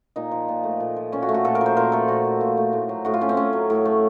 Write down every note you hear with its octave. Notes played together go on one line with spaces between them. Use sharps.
A#2 D#4
F3
A#2
A3
A#2
F3
A#2 C#4
F#4
A3
F#4
A#2 A4
A#4
F3
C5
A#2 A#4
A3 A4
A#2 F#4
F3
A#2
A3
A2
F#3
A2 F#4
F4
A3 C#4
C4
A2 C#4
F#3
A2
A3